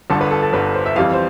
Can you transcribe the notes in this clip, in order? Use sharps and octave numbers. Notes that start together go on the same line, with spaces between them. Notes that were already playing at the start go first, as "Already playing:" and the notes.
G1 G2 D3 A4
B4
A4
A4
G1 G2 D3 B4
C5
E5
F2 E3 G3 F5
C5